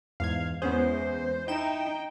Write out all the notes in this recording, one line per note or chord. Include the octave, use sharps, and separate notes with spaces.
E2 G#2 F5 G#6
E2 G#3 B3 C#4 G#4 C5
D#4 E4 G5 E7